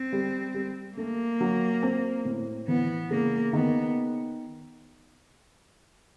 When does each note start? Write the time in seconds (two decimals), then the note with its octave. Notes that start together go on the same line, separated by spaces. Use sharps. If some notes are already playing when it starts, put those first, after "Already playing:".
Already playing: C4
0.13 G3
0.54 G3
0.97 A3 A#3
1.41 F#3
1.83 C4
2.25 A2
2.68 E3 B3
3.10 C#3 A#3
3.53 D#3 B3